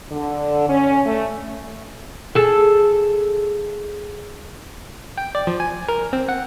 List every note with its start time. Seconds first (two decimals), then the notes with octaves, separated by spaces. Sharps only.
0.12 D3
0.69 C#4
1.06 A3
2.35 G#4 A4
5.18 G5
5.35 D5
5.47 F3
5.60 G#5
5.89 A#4
6.13 C4
6.29 F#5